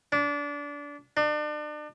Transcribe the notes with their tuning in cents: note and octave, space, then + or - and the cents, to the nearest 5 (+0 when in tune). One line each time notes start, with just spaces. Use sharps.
D4 -25
D4 +35